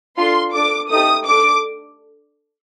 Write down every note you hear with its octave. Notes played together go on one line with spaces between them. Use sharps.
D4 F4 A4 C6
D4 A4 D6
A3 D#4 G4 D#6
D4 A4 D6